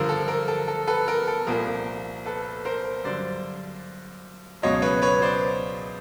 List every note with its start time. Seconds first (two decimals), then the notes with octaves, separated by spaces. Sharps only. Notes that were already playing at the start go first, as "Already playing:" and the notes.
Already playing: G2 D3 F3 A#4
0.09 A4
0.28 A#4
0.48 A4
0.68 A4
0.87 A4 B4
1.08 A#4
1.27 A4
1.47 C2 A#2 F3 A#4
2.26 A4 B4
2.65 A#4 C5
3.04 G2 D3 F#3 C5 D5
4.62 C#2 B2 F#3 C#5 D#5
4.82 B4 C#5
5.02 B4 C#5
5.22 C5 D5